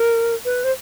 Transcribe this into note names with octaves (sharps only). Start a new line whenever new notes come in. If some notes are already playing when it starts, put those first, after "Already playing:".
Already playing: A#4
B4
C5